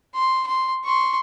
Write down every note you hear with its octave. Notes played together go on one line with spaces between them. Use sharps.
C6
C6
C6 C#6